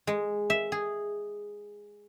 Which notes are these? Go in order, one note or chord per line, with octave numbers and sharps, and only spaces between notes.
G#3
E5
G#4